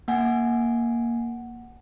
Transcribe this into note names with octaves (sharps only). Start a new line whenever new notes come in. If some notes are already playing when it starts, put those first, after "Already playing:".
A#3 F#5 G#5